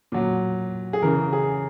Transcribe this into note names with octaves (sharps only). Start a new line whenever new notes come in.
A#2 F#3
G#4
C#3 E3 A#4
G#4